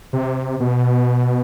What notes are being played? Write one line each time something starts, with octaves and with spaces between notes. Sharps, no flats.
C3
B2